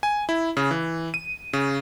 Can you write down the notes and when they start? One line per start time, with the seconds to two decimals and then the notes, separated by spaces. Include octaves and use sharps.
0.03 G#5
0.29 E4
0.57 C#3
0.71 E3
1.14 D#7
1.53 C#3